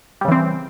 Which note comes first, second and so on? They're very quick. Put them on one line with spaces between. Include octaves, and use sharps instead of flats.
G3 C#3 E3 C4